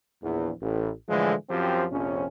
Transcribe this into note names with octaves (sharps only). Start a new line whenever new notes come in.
A#1 E2
A1
A2 D3 E3 F3 G#3
F#2 F3 C4 G4 C5
A#1 F2 C3 C#4